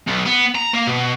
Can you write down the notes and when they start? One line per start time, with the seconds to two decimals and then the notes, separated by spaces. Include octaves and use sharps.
0.08 B1
0.26 B3
0.55 A#5
0.74 A#3
0.87 B2